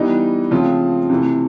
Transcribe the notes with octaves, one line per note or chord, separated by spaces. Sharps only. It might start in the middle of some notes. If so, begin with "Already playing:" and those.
Already playing: E3 G3 B3 D#4
C#3 F3 A3 C4 F4
C3 E3 A3